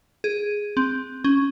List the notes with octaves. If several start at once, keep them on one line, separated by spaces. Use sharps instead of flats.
G#4
C4
C#4